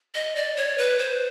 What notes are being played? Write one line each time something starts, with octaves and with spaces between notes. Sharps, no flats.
D#5
D5
C#5
B4
C5